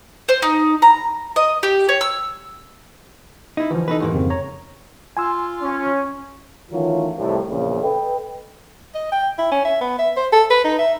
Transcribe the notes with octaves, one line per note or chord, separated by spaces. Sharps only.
C5
D#4
A#5
D#5
G4
C#5
E6
D#4 E4
D2 E3 F3
E3 D#4 F#4 A4 B4
D#2 G#2 A#3
F2 C#3 C4
C#5 A#5
F4 G#5 C6 E6
C#4
D#3 E3 F#3 A3 C#4 F4
C2 F2 A2 C3
A#1 E2 C#3
A4 B4 D#5 G5
D#5
G5
E4
C#4
E5
B3
E5
C5
A4
B4
D#4
E5